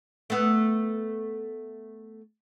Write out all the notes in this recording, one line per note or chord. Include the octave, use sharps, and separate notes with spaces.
A3 B3